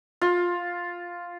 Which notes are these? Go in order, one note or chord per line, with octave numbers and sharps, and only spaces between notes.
F4